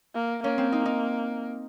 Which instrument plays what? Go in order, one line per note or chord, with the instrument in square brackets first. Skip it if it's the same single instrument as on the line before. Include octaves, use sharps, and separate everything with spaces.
[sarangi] A#3
[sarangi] A#3 [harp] C#4
[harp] C4
D#4
D#4